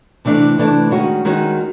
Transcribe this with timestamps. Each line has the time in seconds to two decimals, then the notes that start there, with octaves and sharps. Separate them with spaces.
0.25 C3 E3 A3 D4
0.58 C3 E3 A3 D4
0.91 D#3 G#3 C#4 F#4
1.25 D#3 G#3 C#4 F#4